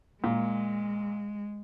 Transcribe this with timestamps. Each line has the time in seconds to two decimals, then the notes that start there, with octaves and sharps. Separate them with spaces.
0.24 A#2 G#3